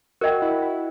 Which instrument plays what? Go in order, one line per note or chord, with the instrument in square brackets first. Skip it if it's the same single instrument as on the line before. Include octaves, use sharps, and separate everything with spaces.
[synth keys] F#4 [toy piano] A#4 D#5 G5
[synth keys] E4
E4